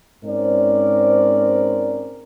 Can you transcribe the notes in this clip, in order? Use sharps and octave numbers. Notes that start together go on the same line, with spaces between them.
G#2 C4 C#4 A#4 C5 D5